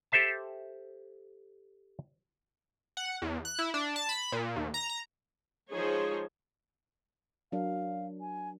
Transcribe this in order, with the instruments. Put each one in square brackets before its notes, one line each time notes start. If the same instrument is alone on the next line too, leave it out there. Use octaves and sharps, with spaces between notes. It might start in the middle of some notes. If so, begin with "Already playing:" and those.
[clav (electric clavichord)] G4 A4 C5 E5 A5
[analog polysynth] F#5
E2
F#6
E4
D4
A5
B5
A#2
D#2
A#5
A#5
[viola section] F3 G#3 D#4 G#4 C5 C#5
[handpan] F#3 D4 A#4 [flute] F5
[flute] G#5